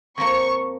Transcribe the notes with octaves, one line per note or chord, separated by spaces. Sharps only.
F2 F3 A#3 C#6